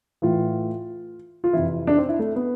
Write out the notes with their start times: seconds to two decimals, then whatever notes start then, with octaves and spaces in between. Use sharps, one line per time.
0.22 A2 E3 F4
1.44 F4
1.53 F2 C3 E3 E4
1.87 D4
1.98 C4
2.09 E4
2.19 A3
2.36 B3